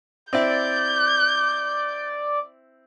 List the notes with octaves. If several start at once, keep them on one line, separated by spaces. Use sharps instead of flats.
C4 E4 D5 G6